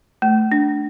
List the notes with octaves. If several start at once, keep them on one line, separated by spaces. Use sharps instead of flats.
A3
D4